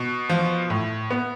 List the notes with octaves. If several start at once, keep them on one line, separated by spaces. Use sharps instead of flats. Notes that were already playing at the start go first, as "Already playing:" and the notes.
Already playing: B2
F3
A2
B3